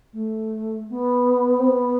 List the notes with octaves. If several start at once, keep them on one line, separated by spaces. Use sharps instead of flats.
A3
B3
C4
B3